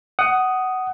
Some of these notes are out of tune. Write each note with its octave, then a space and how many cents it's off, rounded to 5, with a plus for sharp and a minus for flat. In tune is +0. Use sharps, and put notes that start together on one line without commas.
F#5 +15 D#6 +0